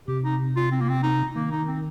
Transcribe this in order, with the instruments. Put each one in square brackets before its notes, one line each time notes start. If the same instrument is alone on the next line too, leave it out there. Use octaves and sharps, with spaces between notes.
[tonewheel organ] C3 [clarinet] G4
[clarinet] D#4
F4
C4
A#3
C4
D#4
[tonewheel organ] D#3 [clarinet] A#3
[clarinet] D#4
C4